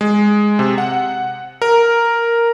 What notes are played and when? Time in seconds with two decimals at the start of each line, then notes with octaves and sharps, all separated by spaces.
0.01 G#3
0.59 C3
0.78 F#5
1.62 A#4